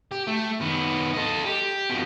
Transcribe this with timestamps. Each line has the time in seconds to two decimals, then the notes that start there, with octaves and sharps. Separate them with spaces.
0.11 G4
0.27 A3
0.61 D#3 B3
1.14 A4 D#5
1.45 G4
1.90 F2 B2